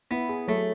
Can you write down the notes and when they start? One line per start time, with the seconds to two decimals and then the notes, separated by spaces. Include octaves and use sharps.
0.11 B3 E4
0.29 G#4
0.48 F#3 A3